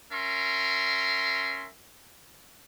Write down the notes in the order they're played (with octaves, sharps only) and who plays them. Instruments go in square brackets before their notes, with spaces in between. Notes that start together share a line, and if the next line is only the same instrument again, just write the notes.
[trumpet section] C#4 A#4 E5 C6